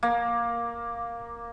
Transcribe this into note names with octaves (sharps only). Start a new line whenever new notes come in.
A#3